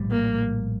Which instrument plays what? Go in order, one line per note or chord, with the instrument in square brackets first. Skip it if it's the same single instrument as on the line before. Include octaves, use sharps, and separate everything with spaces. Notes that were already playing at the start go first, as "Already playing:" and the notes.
Already playing: [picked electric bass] A#1 A2 G3
[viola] A#3